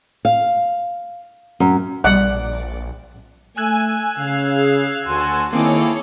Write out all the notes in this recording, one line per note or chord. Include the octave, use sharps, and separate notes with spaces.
F5
F#2
A#1 B2 G3 D5 F#5
A3 G#5 E6 F#6 G#6
C#3 F5
G#4
D2 F#4 G#5 A5 C6
D#3 A#3 C4 E4 G#4 A4 C#5 D6